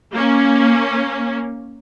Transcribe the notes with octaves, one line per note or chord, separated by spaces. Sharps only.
A#3 C#4